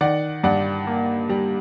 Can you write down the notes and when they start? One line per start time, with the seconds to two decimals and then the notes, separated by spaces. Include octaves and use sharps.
0.01 D#3 D5 F#5
0.44 G2 D5 F#5
0.87 A#3
1.29 G3